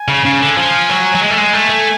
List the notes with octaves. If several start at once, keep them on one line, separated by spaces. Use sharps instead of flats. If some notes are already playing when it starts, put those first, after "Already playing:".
Already playing: G#5
C#3
C#3
D3
F3
F#3
F#3
G#3 G#5
A3
G#3
A3
A3